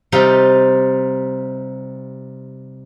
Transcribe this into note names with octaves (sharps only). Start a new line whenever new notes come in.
C3 G3 D#4 F4